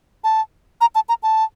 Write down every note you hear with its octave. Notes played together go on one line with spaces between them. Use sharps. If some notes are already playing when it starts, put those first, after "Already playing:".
A5
A#5
A5
A#5
A5